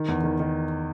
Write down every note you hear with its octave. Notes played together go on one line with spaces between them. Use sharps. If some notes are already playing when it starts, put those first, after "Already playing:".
Already playing: D#3
E2
D#3
D#3